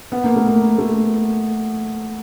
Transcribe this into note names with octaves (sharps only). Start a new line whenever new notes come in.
B3
A#3
A3
A#3
A3